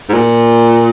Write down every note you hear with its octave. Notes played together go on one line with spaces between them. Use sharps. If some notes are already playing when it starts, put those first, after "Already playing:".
G#2
A#2